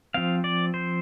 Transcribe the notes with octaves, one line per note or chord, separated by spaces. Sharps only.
F3 C4 F5
D5
C5